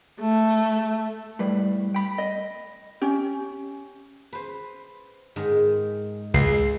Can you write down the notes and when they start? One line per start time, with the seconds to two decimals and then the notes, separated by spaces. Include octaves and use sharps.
0.20 A3
1.39 A2 G3 B4
1.94 G5 B5
2.18 D#5
3.02 C#4 G4
4.33 B4 C5
5.36 G#2 D#3 G#3
6.34 C#2 G#3 C7